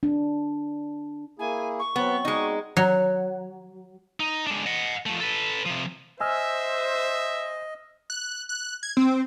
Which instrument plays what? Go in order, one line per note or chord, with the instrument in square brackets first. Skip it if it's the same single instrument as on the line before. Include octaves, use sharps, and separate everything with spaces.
[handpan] D4
[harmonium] A#3 E4 G#4 [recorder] G#5
[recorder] C#6
[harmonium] F#3 C4 [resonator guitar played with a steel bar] B3
[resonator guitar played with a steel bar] G#3 D#4 [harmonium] C4 F#4 D5
[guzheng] F#3
[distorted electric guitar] D#4
G#3 D4
D#5 F#5
F3 A3
A4 B4
C3 F3
[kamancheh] C5 [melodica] D#5 [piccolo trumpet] E5 [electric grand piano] G#5 E6 F6
[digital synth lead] F#6
F#6
G#6
C4